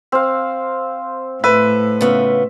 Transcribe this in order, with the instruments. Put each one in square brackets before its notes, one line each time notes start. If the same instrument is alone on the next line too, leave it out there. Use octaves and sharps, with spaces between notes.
[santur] C4 F5
[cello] A2 [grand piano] B4 [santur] E5
[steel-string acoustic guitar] C#3 B3 F4